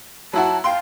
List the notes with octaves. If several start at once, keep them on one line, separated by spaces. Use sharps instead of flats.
F#3 E4 F#4 A5
F5 G5 C6